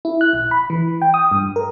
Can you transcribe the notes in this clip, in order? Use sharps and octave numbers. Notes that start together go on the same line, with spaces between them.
E4
F#6
A#1
B5
E3
G5
D#6
G2
A#4